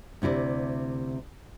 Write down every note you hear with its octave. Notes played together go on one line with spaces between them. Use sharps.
D2 C3 E4 A#4 D5